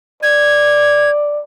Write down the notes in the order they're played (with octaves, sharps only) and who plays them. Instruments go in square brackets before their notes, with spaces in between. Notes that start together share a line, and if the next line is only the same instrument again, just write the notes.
[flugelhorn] D5 [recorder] G#6